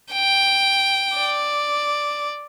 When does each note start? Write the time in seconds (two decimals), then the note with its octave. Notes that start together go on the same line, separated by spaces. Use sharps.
0.13 G5
1.18 D5